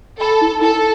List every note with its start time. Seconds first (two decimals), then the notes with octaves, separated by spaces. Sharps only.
0.21 A4 B5
0.41 E4
0.62 E4 A4